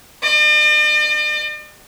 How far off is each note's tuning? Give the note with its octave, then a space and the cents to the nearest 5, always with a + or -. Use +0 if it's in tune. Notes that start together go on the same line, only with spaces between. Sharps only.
D5 +45